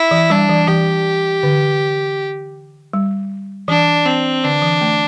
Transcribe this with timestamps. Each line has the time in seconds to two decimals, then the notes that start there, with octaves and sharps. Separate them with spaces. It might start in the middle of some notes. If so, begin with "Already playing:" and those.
Already playing: E4
0.11 E3
0.30 G3 D4
0.49 E3
0.68 E3 G4
1.43 D3
2.93 G3
3.68 E3 D4
4.06 C4
4.43 D3 D4
4.62 E3
4.81 A3